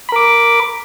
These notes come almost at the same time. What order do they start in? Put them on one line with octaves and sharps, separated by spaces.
B5 A#4 D6